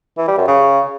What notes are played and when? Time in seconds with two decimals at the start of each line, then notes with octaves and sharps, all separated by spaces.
0.18 E3
0.28 G3
0.38 F#2
0.48 C#3